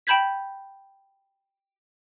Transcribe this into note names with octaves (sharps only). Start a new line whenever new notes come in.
G5 A5 B5 G6 G#6 B6